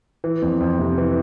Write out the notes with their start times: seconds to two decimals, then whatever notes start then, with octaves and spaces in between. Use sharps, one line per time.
0.24 E3
0.42 F2
0.60 F2
0.79 C3
0.98 E3